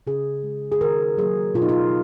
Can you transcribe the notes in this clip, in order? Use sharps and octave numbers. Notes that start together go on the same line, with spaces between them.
C#3 G#4
G#3
G#4
D#3 A#4
F#3 A#3 G#4
B2 F4
D#4
F4